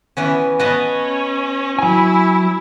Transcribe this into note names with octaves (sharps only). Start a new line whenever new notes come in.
E3 B3 C#4
B3 C#4 D#5 A5
F#3 E4 G#5